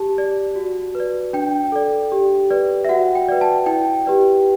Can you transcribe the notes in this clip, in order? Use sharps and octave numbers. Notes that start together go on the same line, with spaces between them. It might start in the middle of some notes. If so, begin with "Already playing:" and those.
Already playing: G4 A5
D5
F#4
B4
D5
D4 G5
A4 D5
G4
B4 D5
E5
F#4 F#5
G5
B4 D5
A5
E4 G5
G4 B4 D5